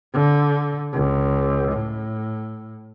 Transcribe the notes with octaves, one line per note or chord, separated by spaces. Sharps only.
D3
C#2
A2